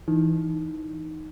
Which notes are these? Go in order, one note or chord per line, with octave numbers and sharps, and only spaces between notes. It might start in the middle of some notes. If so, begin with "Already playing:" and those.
E3 D#4